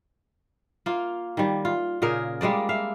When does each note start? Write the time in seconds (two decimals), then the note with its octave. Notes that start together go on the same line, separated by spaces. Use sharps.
0.86 A#3 F4
1.37 D#3 G3
1.65 F4
2.02 A#2 C#3 G#4 A#4
2.41 G3 G#3 A#3 D5
2.69 E5 F5